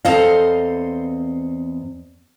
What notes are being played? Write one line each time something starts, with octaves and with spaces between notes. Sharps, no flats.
E2 C4 A4 C5 D#5 F5